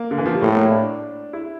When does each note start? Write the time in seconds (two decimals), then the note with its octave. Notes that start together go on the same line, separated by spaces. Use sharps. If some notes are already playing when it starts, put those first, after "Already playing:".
Already playing: A#3
0.11 D3
0.18 E3
0.26 F3
0.34 G3
0.41 A2 A3
0.57 A#3
0.72 D4
1.33 E4